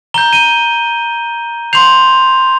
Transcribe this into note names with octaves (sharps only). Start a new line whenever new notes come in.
A#5 G6 G7
D#7 G7
C6 G6 C7 F7